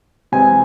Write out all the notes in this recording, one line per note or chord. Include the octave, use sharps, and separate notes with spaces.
C3 E3 G#3 C4 G#4 G#5